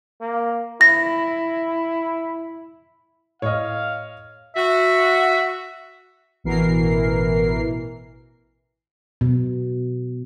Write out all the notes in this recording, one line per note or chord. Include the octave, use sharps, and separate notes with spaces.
A#3
E4 A#6
A2 C#5 D#5 F5
F#4 E5
A1 B2 E3 A#4 C7
B2